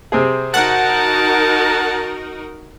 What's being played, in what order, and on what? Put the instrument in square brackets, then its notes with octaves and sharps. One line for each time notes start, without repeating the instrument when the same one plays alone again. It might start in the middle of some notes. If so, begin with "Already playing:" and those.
[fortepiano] C3 C4 G#4
[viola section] D#4 F#4 A#4 [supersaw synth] F#5 [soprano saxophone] A5